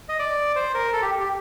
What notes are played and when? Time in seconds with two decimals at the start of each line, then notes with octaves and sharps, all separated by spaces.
0.09 D#5
0.19 D5
0.56 C5
0.75 A#4
0.93 A4
1.02 G4
1.20 G4